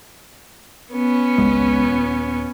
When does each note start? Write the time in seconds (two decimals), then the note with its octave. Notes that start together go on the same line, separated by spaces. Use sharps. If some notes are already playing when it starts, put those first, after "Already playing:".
0.94 B3 C#4
1.38 G#1 C#2 G#3
1.83 D#1